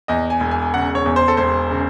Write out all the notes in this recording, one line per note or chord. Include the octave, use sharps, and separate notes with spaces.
E2 D#5
G#5
E1
G#5
C#3 F#5
C#5
E2
C5
A4
E1 C5
C#3